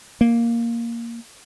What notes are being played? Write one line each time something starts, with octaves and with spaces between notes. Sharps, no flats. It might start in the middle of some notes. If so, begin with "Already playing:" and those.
A#3